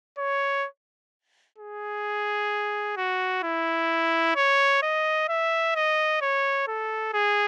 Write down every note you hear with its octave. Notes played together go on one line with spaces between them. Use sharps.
C#5
G#4
F#4
E4
C#5
D#5
E5
D#5
C#5
A4
G#4